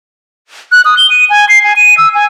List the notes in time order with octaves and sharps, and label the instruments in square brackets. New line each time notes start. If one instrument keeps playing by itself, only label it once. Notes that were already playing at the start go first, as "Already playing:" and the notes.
[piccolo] F#6
D#6
G7
D#7
G#5
C7
G#5
D#7
E6
G#5